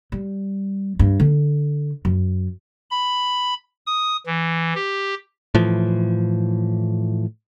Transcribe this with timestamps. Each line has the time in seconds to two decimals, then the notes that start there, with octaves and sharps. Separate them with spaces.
0.12 G3
0.99 G2
1.20 D3
2.05 F#2
2.91 B5
3.86 D#6
4.27 E3
4.75 G4
5.55 A2 E3 F3